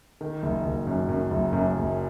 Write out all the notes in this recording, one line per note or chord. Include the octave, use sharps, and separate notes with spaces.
D#3
F#1
F#1
F#2
F#2
F#1
F#2
F#1